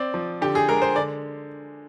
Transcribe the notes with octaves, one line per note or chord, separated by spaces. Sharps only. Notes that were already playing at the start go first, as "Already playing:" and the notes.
Already playing: C4 D5
F3
D3 G4
G#4
G#3 A#4
C5
D3 D5